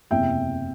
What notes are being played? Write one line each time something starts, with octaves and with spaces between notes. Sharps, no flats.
F#1 E2 C3 E5 G5